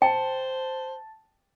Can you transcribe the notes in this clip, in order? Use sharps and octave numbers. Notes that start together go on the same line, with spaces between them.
C5 G5 A5